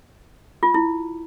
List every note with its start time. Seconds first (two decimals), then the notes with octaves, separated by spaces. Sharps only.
0.63 F4
0.74 E4